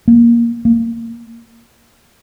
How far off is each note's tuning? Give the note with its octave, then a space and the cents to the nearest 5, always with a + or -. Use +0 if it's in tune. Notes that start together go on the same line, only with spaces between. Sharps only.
A#3 +10
A#3 -15